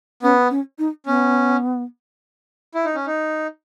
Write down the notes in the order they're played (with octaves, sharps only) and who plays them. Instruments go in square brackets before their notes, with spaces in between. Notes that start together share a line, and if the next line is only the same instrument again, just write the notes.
[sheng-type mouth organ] B3 [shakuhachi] C#4
[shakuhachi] C#4
D#4
[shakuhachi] B3 [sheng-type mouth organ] C#4
[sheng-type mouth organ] E4
D#4
C#4
D#4